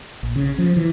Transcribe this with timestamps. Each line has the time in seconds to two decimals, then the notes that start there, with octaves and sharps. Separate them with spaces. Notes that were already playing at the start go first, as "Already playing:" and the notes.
0.23 A#1
0.36 C#3
0.58 F3
0.76 E3